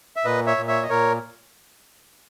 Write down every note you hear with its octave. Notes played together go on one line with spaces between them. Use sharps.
E5
A#2 B4 D#5
C#5 E5
A#2
C#5 E5
D#5
A#2 A#4 C#5